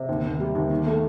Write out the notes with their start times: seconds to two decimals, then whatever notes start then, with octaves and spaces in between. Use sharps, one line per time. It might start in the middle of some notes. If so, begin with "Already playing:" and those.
Already playing: C3
0.09 D#2
0.24 D#2
0.40 G3
0.55 D#2
0.71 D#3
0.87 A3